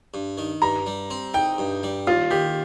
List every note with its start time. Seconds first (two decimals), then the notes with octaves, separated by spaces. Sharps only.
0.14 G2
0.38 D#3
0.62 G2 A#5
0.86 G3
1.10 C4
1.34 D#4 G5
1.58 G2
1.83 G3
2.07 D#2 F4
2.31 D#3 G4